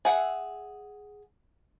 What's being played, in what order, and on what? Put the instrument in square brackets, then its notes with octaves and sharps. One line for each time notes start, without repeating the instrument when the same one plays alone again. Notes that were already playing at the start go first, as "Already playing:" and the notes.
[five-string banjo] G#4 E5 F#5